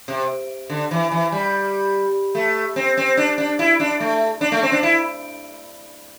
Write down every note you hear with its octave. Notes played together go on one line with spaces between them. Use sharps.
C3
D3
E3
E3
G3
A3
C4
C4
D4
D4
E4
D4
A3
D4
A3
C4
D4
E4